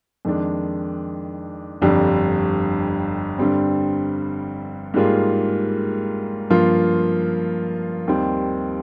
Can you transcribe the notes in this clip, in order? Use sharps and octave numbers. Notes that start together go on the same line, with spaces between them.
F2 D#3 G#3 D4
G1 F2 D3 G3
G2 D3 G3 C4
G#2 G3 A#3 F4 G#4
G2 F3 A#3 F4
D#2 D#3 G3 C4